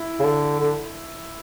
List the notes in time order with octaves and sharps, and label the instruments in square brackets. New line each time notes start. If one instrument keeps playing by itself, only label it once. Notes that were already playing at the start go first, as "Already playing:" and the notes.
Already playing: [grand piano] E4
[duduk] C#3
D3
D3